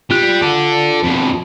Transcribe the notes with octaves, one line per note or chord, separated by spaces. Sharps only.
G3 F4 F#6
A4 D5
F2 B2